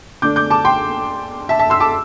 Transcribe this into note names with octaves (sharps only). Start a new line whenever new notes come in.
D3 A3 D4 D6 G6
D6 G6
A5 D6
G5 C6
E5 A5
E5 A5
C6 E6
A5 D6